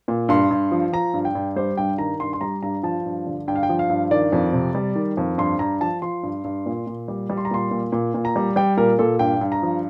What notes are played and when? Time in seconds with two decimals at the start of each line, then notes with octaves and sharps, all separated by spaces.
0.08 A#2
0.29 G2 C6
0.51 G2
0.71 F3
0.93 F3 A#5
1.14 G2
1.25 G5
1.35 G2
1.56 G3 C5
1.77 G2 G5
1.98 D#3 A#5
2.20 G2 C6
2.33 C6
2.41 G3 A#5
2.63 G2 A#5
2.83 F3 A5
3.06 G2
3.27 D3
3.48 G2 G5
3.56 F5
3.63 G5
3.69 F3
3.79 F5
3.90 G2
4.11 D#3 D5
4.32 F2
4.53 C3
4.75 G3
4.95 D#3
5.17 F2
5.38 G2 C6
5.59 G2 A#5
5.81 F3 A5
6.02 F3 C6
6.23 G2
6.44 G2
6.66 A#2
6.87 A#2
7.08 G3
7.30 G3
7.37 C6
7.45 A#5
7.51 A#2 C6
7.71 A#2
7.92 A#2
8.14 A#2
8.25 A#5
8.36 G3
8.56 G3 G5
8.77 A#2 A#4
8.99 A#2 A4
9.19 G2 G5
9.41 G2
9.52 A#5
9.63 F3